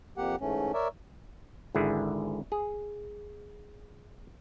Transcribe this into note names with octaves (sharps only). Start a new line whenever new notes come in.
F2 A#3 G4 F#5
G#2 E3 A3 C#4
A#4 C#5 D5 E5
G#1 G#2 D3 E4 G#4
G#4